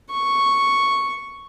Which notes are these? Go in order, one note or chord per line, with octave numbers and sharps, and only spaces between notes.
C#6